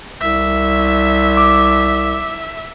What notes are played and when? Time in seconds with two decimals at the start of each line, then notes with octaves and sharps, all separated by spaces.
0.21 C2 E5
1.37 D6